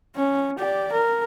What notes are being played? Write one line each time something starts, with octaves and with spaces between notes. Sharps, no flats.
C#4
G4 D5
A#4